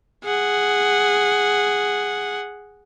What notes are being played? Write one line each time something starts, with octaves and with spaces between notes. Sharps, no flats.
G#4 F#5